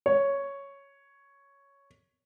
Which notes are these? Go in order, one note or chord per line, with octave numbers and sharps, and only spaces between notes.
C#5